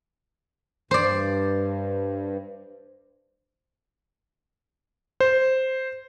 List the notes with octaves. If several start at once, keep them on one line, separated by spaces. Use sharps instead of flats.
G2 C5 D5
C5